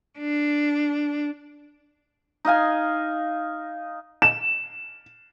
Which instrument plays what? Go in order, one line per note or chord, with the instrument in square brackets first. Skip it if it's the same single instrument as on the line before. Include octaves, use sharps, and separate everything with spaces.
[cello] D4
[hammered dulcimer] D#4 D#5 F5 G#5
[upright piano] E7